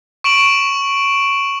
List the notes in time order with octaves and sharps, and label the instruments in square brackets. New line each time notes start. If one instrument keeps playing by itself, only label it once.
[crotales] C#6 D7 E7 F#7